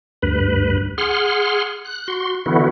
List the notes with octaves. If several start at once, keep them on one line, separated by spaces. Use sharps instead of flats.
D2 G2 B4
G#4 F#5 C6 F6
F#6
F#4 C6
D3 E3 B3 E4 F#4